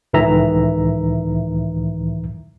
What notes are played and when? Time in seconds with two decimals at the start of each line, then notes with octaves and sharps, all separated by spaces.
0.13 C#2 A2 D#3 E3 E5 A#5